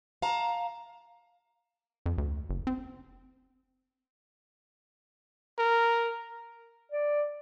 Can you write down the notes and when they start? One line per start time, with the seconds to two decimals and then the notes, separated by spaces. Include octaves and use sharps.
0.22 F5 A5 A#5
2.06 F2
2.18 D2
2.49 F#1
2.67 C4
5.58 A#4
6.92 D5